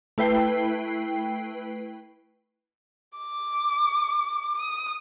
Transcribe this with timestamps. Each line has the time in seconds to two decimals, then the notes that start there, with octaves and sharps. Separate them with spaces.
0.18 A3 E4 B4 G5 C7
3.18 D6
4.57 D#6